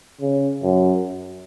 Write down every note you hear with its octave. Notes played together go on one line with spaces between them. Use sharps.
C#3
F#2